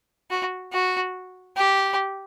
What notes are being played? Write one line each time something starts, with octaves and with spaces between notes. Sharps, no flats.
F#4
F#4
G4